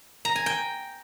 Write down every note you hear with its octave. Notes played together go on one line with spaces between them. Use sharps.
A#5
G#5
G5